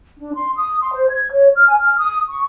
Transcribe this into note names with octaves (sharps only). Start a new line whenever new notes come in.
D4
C6
D#6
C6
C5
G#6
C#5
F6
G#5
F6
D#6
C#6